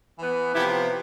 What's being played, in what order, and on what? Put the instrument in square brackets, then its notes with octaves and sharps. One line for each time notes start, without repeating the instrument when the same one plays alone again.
[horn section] E3 B3
C3 F3 B3 E4 G4